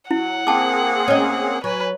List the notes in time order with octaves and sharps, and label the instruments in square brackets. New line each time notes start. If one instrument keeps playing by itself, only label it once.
[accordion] F#3 [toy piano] E4 [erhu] F#5
[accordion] A#3 C4 G#4 [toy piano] G5 A5 D6
[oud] C#4 D#5
[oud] F#3 [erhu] B4 [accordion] G#5